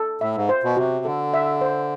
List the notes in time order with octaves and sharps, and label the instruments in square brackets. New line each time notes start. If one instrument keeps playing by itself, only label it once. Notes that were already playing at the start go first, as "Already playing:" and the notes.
Already playing: [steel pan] A4
[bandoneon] A2 [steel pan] E5
[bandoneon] G#2
[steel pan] C5
[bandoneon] B2
[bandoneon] C3 [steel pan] F#4
[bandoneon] D3 [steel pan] A4
[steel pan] E5
C5